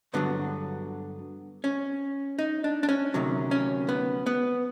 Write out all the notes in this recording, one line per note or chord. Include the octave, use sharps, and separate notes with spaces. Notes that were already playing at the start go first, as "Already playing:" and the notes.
G2 D3 F#3 B3
C#4
D#4
D4
D4
C#4
D2 C3 D#3 F#3
C#4
B3
B3